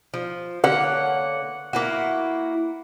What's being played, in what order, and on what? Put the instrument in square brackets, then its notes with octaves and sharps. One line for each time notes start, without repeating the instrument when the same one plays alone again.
[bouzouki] F3
[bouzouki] D3 A#3 C#5 [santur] F#5
[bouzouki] A#3 E4 F#4